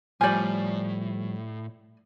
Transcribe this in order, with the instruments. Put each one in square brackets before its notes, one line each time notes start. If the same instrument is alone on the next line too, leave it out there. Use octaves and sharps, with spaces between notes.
[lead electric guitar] A2 [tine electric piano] F3 G3 [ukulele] D5 G#5